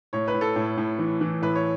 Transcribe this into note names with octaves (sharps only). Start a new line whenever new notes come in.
A2 C#5
B4
A2
A4
A2
A2
E3
E3
A2 B4
C#5